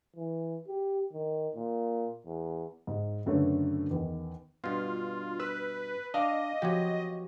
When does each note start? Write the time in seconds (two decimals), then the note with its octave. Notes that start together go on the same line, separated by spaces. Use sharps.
0.16 E3
0.67 G4
1.13 D#3
1.55 A#2
2.26 E2
2.87 G#2
3.25 F#1 F#2 D3 A3 B4 C#5
3.91 E2 D#3 B3
4.64 G2 B2 F4
5.39 B4 E6 F6
6.14 D4 D#5 F5 G5 D6
6.62 F3 B3 F#4 G4 C#5